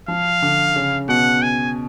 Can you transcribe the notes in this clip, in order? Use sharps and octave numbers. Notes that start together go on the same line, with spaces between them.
F3 F5
D3
C#3
B2 F#5
G#5